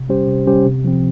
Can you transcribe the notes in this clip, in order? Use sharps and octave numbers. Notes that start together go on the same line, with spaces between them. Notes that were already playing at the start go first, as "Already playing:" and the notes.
Already playing: C3
G3 C#4 G4 C5
C3
G3 C#4 G4 C5
C3
F3 C4